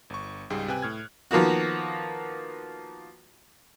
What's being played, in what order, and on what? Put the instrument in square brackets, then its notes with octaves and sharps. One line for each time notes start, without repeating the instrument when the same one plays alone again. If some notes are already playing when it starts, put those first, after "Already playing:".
[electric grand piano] G1 C#6
C#2 G#2 G3 G#4 G5
C3 B4 G5 G#5 F#6
A2 F6 G#6
[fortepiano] D#3 F3 A#3 B3 F#4